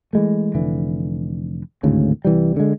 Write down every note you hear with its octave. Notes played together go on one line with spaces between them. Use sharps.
E3 G#3 A3
F1 D3 E3
G#1 D2 A2 C#3
C2 E3 G3
D3 G#3